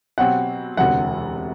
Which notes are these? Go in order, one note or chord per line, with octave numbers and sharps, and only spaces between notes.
B2 F#3 C4 G4 F#5
E1 D2 C3 F#5